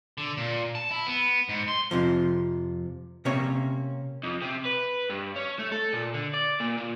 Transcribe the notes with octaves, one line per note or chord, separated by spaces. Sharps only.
D3
A#2
A5
E4
B3
G#2
C6
F2 A2 C3 F3
C3 A#3 C#4 C#5
F2
C3
B4
G2
C#4
A3
A4
A#2
D3
D5
A#2
A#2